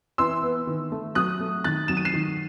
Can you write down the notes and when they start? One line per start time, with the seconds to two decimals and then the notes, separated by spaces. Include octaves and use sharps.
0.18 E3 C6 E6
0.43 B3
0.67 D#3
0.92 A3
1.15 F#3 D#6 F#6
1.40 A3
1.64 D#3 F#6 A6
1.88 F#3 E7
1.97 D#7
2.05 C7 E7
2.14 D#3